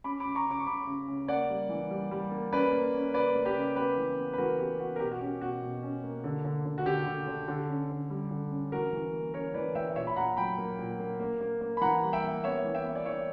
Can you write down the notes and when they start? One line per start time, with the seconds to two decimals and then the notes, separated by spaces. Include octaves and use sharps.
0.04 C#4 B5 D6
0.20 B5 D6
0.25 C#3
0.35 A#5 C#6
0.46 C#3 D6
0.59 C#6
0.66 C#3 B5 D6
0.87 C#3
1.08 C#3
1.28 A#3 D5 F#5
1.49 G3
1.69 E3
1.90 G3
2.11 G3
2.31 A#3
2.52 C#4 B4 D5
2.73 A#3
2.94 C#4
3.14 C#3 B4 D5
3.35 A#3
3.45 G4 B4
3.56 C#3
3.76 B3 G4 B4
3.97 E3
4.17 B3
4.33 B4
4.38 E3 F#4 A#4
4.59 B3 G4
4.79 B3 F#4
4.96 A#4
5.00 B2 G4
5.12 F#4
5.21 C#4 G4
5.41 B2 F#4
5.63 B2
5.83 C#4
6.03 A#3
6.24 D3
6.45 D3
6.65 D3
6.78 F#4
6.86 D3 G4
7.07 D3
7.27 D3
7.48 D3
7.69 C#4
7.90 D3
8.10 G3
8.31 D3
8.51 C#4
8.72 E3 F#4 A#4
8.93 E3
9.13 A#3
9.34 C#4 A#4 C#5
9.54 E3 B4 D5
9.75 E3 E5 G5
9.96 A#2 C#5 E5
10.07 B5
10.16 A#2 F#5 A#5
10.37 F#3 G5 B5
10.58 A#3
10.79 A#2
10.99 A#3
11.20 A#3
11.41 A#3
11.61 A#3
11.77 B5
11.81 E3 F#5 A#5
12.02 G3
12.13 E5 G5
12.24 A#3
12.44 B3 C#5 E5
12.64 E3
12.75 E5 G5
12.85 B3
12.95 D5
13.06 E3 C#5 E5